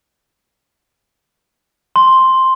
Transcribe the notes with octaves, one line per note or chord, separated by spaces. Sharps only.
C6